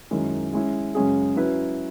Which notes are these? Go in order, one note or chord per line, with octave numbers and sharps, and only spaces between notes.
F#2 D#3 G#3 C#4 E4
G#3 C#4 E4
F#2 C#3 G#3 C#4 G#4
F#3 C#4 E4 B4